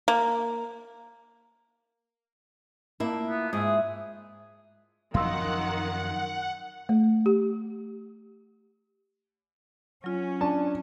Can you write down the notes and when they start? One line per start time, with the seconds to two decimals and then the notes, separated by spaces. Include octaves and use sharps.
0.08 A#3
3.00 A#2 A#3 E4 A5 D6
3.30 B3
3.53 G#2 G#4 D5 E5
5.14 F#2 D#3 F3 F#3 F5 F#5 C6 E6
6.89 A3
7.26 G4
10.04 F#3 C#4 F4
10.41 D4 A5